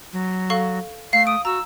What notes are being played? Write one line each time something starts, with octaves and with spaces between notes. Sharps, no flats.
F#3
A4 F5 C#6
A3 F5 C7
D#6 D7
F#4 A#5 E6